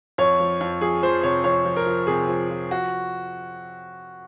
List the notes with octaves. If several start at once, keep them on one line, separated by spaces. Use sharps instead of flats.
F2 C#5
F3
F2
F3 G#4
F3 C5
C3 C#5
F2 C#5
F3
A#4
F3
C3 G#4
F3
F3
F#4